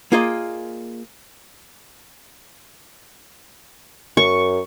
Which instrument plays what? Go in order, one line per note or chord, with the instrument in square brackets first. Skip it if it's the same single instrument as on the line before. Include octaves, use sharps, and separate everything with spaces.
[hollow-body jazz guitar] A#3 F4 G#4 D5 D#5
[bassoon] F#2 [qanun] C#6